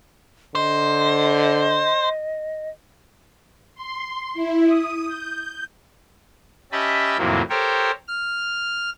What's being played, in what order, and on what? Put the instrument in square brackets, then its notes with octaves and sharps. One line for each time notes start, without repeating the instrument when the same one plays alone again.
[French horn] D3 [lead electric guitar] C5 [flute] D#5
[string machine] C6
E4
D#6
G6
[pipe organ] C#4 G4 D#5 E5 A5 B5
F2 A2 C3 E3 F#3 A#3
G4 A4 A#4 C5 C#5 G5
F6